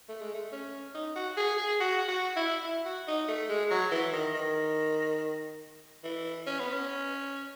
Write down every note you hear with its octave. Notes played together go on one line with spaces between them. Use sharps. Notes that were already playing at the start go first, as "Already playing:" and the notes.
A3
G#3
A3
C#4
D#4
F#4
G#4
G#4
F#4
F#4
E4
E4
F#4
D#4
A3
G#3
F#3
E3
D#3
D#3
E3
C#4
B3
C#4